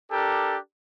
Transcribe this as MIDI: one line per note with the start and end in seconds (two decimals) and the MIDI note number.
0.11 0.57 62
0.11 0.57 67
0.11 0.57 69
0.11 0.57 70